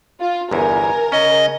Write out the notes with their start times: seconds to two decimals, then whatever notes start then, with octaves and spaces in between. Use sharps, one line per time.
0.21 F4
0.51 G1 E2 A#4 G#5
1.12 C#3 C#4 D#5